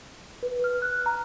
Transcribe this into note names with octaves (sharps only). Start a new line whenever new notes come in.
B4
F6
F#6
A#5